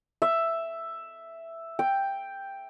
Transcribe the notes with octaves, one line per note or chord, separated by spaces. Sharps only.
E5
G5